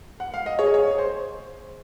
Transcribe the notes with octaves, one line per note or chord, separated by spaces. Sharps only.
F#5
F5
D#5
G#4 C#5
D#5
C#5
C5